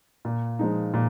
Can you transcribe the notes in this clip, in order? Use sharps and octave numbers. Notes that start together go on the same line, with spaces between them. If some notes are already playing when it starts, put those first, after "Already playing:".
A#2
F3 G#3 D#4
A#2